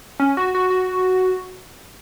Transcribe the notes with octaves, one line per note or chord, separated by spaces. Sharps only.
C#4
F#4
F#4
F#4